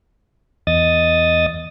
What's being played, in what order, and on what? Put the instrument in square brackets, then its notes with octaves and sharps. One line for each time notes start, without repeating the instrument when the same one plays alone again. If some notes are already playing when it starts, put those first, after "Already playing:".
[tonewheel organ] E2 D#5 D#6 A6